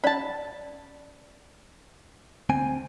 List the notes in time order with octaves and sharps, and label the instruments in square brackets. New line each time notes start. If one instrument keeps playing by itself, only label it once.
[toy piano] C#4 D5 [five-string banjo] A5 B5
[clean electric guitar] D2 C4 G#5